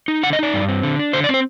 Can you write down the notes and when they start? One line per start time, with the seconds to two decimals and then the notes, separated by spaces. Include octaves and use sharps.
0.08 D#4
0.23 D3 F#5
0.33 D#5
0.39 D#4 D5
0.54 G2
0.69 C4
0.83 D3
0.99 D4
1.13 D3 C5
1.24 D5
1.29 C4 C5